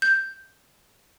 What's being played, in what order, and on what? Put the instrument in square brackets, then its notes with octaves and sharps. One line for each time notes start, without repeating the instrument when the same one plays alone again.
[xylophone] G6